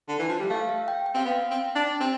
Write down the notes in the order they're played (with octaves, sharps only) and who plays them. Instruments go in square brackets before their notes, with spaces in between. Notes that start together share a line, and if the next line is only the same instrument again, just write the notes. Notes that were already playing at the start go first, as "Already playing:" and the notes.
[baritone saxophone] D3
E3
F3
G3
[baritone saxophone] A3 [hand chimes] F5
[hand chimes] E5
G5
G5
[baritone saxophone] C4 [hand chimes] F5
[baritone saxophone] B3 [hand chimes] G5
[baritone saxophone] C4
D4
C4